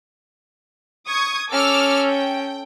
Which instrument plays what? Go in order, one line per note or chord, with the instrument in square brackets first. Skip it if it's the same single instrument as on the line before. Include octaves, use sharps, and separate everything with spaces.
[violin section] C#6 D#6 G#6
[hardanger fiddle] C#4 A4 [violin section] D6 E6 F6
[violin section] G5